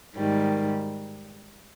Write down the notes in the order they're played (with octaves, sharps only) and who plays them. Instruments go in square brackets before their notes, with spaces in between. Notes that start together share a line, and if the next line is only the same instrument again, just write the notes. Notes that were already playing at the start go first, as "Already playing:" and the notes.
[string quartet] G#2 D#3 G3